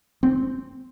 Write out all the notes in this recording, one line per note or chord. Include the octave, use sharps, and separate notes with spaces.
C4